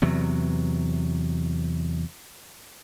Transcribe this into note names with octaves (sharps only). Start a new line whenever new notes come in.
E2 C3 F#3